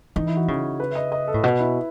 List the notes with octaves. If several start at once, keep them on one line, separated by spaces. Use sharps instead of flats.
E3 D#4
E4
F#4
C#3
B4
E5
D#5
D#5
A4
A2
B2 B4
E4